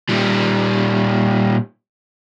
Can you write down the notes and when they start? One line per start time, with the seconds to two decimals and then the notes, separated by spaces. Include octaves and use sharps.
0.09 A#2 G3